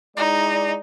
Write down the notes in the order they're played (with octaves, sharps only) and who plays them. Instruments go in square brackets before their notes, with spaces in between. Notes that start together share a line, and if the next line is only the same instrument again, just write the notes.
[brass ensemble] G#3 E4 D5 [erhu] D#4